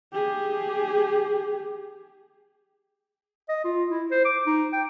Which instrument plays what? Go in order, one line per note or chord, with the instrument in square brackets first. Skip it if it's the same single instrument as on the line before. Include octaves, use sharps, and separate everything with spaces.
[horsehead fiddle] G4 G#4
[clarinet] D#5
F4
E4
C5
D6
D#4
G5